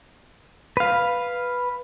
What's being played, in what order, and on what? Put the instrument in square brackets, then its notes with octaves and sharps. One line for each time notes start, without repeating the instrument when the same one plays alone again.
[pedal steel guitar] B4 F5